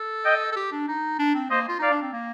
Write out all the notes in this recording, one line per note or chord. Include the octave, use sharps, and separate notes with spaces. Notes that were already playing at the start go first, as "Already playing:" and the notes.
Already playing: A4
D#5 G5
A4
G4
D4
D#4
D4
C4
A#3 C5 D#5
F4
D#4 D5 F5
D4
C4
A#3